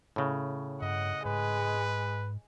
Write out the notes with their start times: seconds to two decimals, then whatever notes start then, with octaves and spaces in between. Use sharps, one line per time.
0.16 A2 C#3
0.82 G2 D#5 F#5
1.25 G#2 G#3 B4